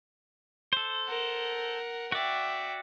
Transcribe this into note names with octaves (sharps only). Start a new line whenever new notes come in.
A4 C5
A#4 F#5
F#4 D5 E5 G5